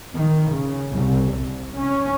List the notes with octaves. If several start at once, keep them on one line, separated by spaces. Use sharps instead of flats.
D#3
C#3
C2
C2
C#4